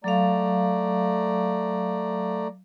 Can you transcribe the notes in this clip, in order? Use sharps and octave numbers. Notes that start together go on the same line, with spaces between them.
F#3 A3 D5 F5 A#5